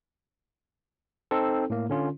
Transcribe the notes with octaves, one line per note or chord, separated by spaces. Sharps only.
C4 D#4 A4
A2 A#3
D3 C#4 F4